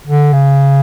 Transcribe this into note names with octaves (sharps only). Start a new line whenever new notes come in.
D3
C#3